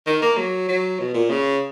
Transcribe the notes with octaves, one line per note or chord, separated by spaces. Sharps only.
D#3
A#3
F#3
F#3
B2
A#2
C#3